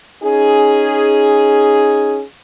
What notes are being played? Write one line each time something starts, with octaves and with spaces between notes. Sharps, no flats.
C#4 D#4 G#4